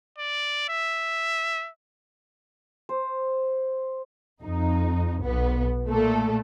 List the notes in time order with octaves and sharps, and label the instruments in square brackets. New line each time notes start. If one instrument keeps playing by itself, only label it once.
[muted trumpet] D5
E5
[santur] C5
[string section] F2 D#4
B1 B3
A#2 A3 A4